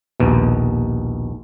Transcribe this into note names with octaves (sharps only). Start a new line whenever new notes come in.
A#1 D#2 B2